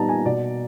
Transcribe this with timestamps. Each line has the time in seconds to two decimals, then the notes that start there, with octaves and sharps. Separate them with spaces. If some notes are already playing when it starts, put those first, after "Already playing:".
Already playing: A#2 G3 B3 D#4 A5 A#5
0.09 G#5
0.25 B2 D5